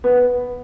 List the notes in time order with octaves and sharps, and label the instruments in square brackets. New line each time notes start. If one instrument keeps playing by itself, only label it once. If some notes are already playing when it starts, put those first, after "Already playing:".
[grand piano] B3